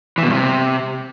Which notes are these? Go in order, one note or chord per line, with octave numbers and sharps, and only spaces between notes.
E3
B2
G2
C3